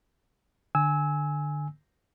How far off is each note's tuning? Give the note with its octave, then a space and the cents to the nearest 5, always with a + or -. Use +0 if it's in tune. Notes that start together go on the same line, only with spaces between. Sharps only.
D3 +20 G#5 +0 E6 -20